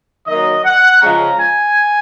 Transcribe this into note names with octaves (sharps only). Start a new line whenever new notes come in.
D#3 F#3 A#3 D#5
F#5
C#3 F3 G#3 C#4 A#5
G#5